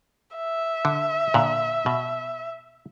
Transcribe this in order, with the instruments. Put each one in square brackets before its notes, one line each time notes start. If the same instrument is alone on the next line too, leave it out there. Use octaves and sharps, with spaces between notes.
[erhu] E5
[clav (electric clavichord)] D3
A#2 D3
B2